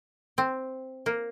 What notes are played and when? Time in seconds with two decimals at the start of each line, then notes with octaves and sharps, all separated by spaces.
0.38 C4
1.06 A#3